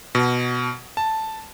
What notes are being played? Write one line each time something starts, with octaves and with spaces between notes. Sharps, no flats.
B2
A5